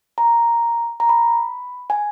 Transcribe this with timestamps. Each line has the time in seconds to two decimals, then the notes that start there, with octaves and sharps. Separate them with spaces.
0.18 A#5
1.00 A#5
1.09 B5
1.90 G#5